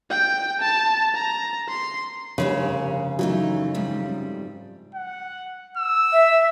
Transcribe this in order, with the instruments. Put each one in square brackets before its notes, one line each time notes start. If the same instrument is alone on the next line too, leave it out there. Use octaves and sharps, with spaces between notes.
[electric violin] G5
A5
A#5
C6
[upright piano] F1 G2 [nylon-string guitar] C#3 [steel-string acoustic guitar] F#4 A#4 C#5
[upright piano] F#2 [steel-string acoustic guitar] E3 A3 D#4
[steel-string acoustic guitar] F2 G#2 G3
[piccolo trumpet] F#5
E6
[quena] E5